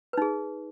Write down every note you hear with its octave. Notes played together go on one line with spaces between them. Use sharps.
D#4 G#4 B4